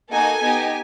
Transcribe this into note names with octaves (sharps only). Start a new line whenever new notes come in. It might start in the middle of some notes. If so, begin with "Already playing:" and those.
A#3 D#4 F#4 A4 G#5
B3 D#4 G4